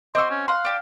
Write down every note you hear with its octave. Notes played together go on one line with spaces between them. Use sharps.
C4 F#4 D#5 C6 D6 E6
C#4
F5 F#5 C6
D4 G4